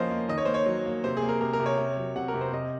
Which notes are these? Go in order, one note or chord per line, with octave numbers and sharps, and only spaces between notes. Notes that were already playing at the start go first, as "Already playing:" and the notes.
Already playing: F3 A#3 C#4 C5 D#5 F5
A#3
D#3 D#5
C#5
A#3 C5
C#5
F#3
A#3
C3 C5
G#4
A#3
A#4
C3 A#4
A#4
C3
C#5
C3
F#3
C3 F#5
A#4
C3
C5
C3 D#5